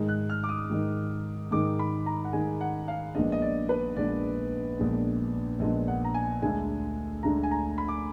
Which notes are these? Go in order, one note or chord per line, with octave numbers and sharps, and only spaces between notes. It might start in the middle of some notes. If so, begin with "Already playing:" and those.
Already playing: G#2 D#3 G#3 D#4
F#6
F6
D6
D#6
G#2 D#3 G#3 D#4
G#2 D#3 G#3 D#4 D6
B5
A#5
F#5
G#2 D#3 G#3 D#4 G#5
F#5
F5
A#1 A#2 G#3 B3 D4 D#5
D#5
D5
B4
A#1 A#2 G#3 B3 D4 D5
A#1 A#2 G#3 B3 D4
A#1 A#2 G#3 B3 D4 D#5
F#5
A#5
G#5
D2 D3 G#3 D4 G#5
D2 D3 G#3 D4 A#5
G#5
A#5
B5
D6